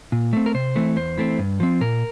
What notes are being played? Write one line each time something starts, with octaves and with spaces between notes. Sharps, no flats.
A#2
A3 C4
A#4
C3 C5
E3 A3 C4
E2 C5
E3 A3 C4
G2
F3 C4
A#2 A#4